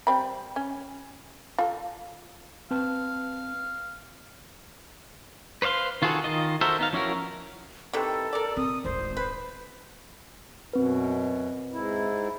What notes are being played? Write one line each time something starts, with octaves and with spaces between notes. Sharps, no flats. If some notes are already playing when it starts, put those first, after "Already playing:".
G3 C4 B5
C#4
F4 A4
C4 B4 F5 A5
B4 C5 D5 F5 C6
D#3 F4 F#4 G#4 A4
D#3 F4 D#5
F#4 A4 A#4 C5 E5
B3 D#4 F5
F3 C#4 E4 F#4 A#4
C3 D#3 E3 A4
A#4 D5
C3 D#6
D1 G#1 C5
B4
F#2 B2 C4 B4
G#2 E4